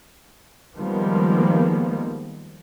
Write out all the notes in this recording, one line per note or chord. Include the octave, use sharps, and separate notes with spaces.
D#3 F3 G3 G#3 A#3 B3